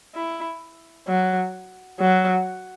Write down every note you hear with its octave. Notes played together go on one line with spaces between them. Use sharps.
E4
F#3
F#3